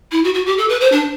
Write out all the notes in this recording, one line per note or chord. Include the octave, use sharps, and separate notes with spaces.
E4
F#4
F#4
G4
A4
B4
C5
D4